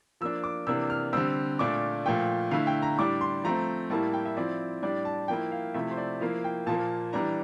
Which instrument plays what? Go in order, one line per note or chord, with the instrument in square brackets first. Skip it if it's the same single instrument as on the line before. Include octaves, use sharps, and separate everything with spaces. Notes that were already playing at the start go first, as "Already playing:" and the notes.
[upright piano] F3 A#3 D4 E6
D6
C3 E3 A#3 D4 E6
F6
D3 G3 C4 E6
A#2 A3 D4 D6
A#2 F3 A3 G5
D3 A3 E4 F5
G5
A#5
A2 G3 D4 D6
C6
F3 A3 C4 A#5
A2 G3 A#3 E4 A5
G5
E5
F3 C4 E4 D5
A2 G3 D4 D5
A5
F3 A#3 E4 G5
F5
C3 F3 A3 E4 E5
C5
D5
F3 A#3 E4 F5
G5
A#2 F3 A#3 A5
E3 G3 D4 A#5